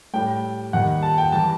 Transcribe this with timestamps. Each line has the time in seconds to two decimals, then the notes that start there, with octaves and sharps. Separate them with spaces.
0.14 A2 G3 G5
0.73 D#2 D#3 G3 F#5
1.03 A5
1.18 G5
1.32 E3 G3 A5